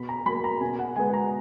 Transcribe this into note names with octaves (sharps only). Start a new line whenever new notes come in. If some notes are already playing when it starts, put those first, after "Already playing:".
Already playing: B2 B5
A#5
F#3 A#3 B5
A#5
B2 G#5
F#5
G#3 B3 G#5
A#5